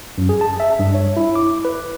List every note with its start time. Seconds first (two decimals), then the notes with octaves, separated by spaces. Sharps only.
0.18 F#2
0.29 G#4
0.41 A5
0.60 E5
0.79 G2
0.94 C#5
1.17 E4
1.36 D6
1.65 B4